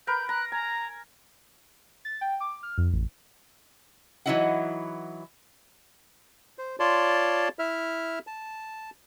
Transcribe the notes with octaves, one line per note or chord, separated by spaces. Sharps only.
A#4 B4 G6
A#5 F#6
G#5 A#5
A6
G5
D6
F6
F2
A1
E3 F#3 D#4 E4 D#5 F#5
C5
F4 C#5 D5 A5 C6
E4 E5 F6
A5